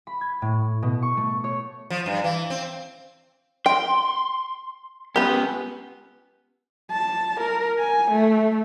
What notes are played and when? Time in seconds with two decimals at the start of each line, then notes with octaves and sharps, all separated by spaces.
0.07 B5
0.21 G#6
0.42 A2
0.82 B2
1.02 C#6
1.17 A3
1.44 C#5
1.90 F3
2.06 G2
2.24 E3
2.50 C4
3.66 G5 C6
5.16 B3 C#4 F4 G4
6.90 A5
7.40 A#4
7.78 G#5
8.11 A3